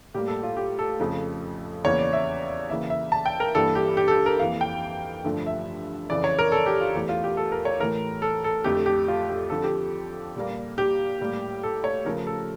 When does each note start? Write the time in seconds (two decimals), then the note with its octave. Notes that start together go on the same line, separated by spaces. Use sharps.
0.14 A2 G3 A#3 G4
0.28 A4
0.43 F4
0.57 G4
0.79 A4
0.99 F2 C#3 F3 A3
1.84 E2 C#3 E3 A#3 C#5
1.99 D5
2.13 E5
2.70 C#3 E3 A#3 E5
2.90 E5
3.12 A5
3.26 G5
3.40 A#4
3.54 G2 E3 G3 A#3 A4
3.75 G4
3.97 G4
4.08 A4
4.11 G4
4.26 A#4
4.39 F2 E3 A#3 F5
4.61 G5
5.24 G2 D3 F3 A3
5.47 E5
6.10 F2 C#3 E3 D5
6.24 C#5
6.39 A#4
6.52 A4
6.66 G4
6.81 F4
6.95 E2 E3 A3 G4
7.09 F4
7.24 G4
7.37 A4
7.52 A#4
7.65 C#5
7.80 A2 E3 A3 A#4
8.22 A4
8.44 A4
8.64 F2 D3 A3 G4
8.86 G4
9.08 F4
9.29 G4
9.50 F2 D3 F3 A4
9.64 G4
10.36 A#2 G3 A#3
10.78 G4
11.21 A2 G3 A#3
11.63 A4
11.84 C#5
12.05 C#3 F3 A3 A#4
12.27 A4